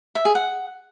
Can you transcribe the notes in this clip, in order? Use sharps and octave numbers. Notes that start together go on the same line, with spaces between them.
E5
G#4
F#5